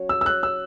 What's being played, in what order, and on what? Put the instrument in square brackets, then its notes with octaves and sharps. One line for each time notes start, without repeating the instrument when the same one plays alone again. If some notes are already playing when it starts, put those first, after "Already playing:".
Already playing: [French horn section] F#3 C#4 F#4 C#5
[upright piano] E6
E6
F#6
E6